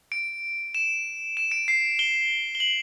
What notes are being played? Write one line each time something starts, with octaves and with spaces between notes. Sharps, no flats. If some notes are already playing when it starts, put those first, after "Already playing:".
D7
E7
E7
D7
C7
G7
G7
F#7